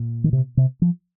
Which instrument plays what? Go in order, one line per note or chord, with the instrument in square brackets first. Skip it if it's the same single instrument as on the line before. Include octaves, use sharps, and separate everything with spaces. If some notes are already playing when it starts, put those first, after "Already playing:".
Already playing: [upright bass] A#2
[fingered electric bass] D#3
C3
C3
F3